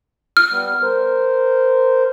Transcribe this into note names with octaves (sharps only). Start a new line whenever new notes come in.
F6
G3 B3
A#4 C5